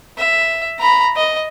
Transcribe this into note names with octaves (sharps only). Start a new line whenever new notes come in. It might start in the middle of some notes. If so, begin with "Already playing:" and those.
E5
A#5 B5
D#5